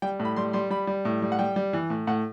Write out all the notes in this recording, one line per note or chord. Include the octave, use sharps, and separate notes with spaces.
G3 G5
A2
B5
G3 C6
G3 C6
G3 B5
G3
A2
G3
F#5
G3 G5
G3
E3
A2
A2 F#5